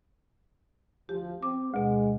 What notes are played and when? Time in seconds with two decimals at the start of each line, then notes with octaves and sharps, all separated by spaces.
1.09 D2 F3 G4
1.43 C4 D6
1.74 D2 B2 G#3